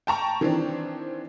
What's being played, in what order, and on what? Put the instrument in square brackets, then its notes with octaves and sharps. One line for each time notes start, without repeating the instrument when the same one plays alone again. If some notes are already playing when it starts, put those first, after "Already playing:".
[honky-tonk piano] G5 A5 A#5 C#6
D#3 E3 C4 D4